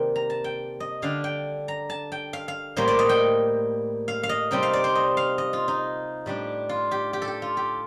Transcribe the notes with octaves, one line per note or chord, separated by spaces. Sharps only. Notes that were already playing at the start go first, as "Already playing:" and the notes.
Already playing: C3 D#3 G3 A#3 D#4 G5
A#5
A5
G5
D#5
D3 G3 D4 F5
G5
A#5
A5
G5
F5
F5
A2 G3 A#3 C5
D5
D#5
G5
F5
F5
D#5
C3 G3 C4 D#4 G5
F5
D5
C5
D#5
F5
D#5
F4
D#4
A2 G3 D4
F4
G4
G4
A4
G4
F4
G4